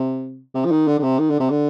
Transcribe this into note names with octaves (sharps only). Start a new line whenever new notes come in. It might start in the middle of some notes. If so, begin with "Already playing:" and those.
Already playing: C3
C3
F3
D#3
D3
D3
C3
D#3
D3
C3
D3